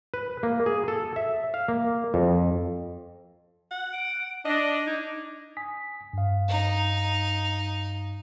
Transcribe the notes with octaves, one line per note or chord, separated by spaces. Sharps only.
B4
A#3
G#4
A4
E5
F5
A#3
F2
F#5
D7
D4 D#5 A#6
D#4 G#6
G#5 D#6 B6
G2 F5
D#4